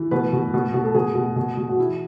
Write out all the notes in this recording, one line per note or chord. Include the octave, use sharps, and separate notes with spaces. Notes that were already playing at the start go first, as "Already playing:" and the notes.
Already playing: E3
B2 B4
B2
B2
B2
A4
B2 G#4
B2
B2
B2
F#4
E3 E4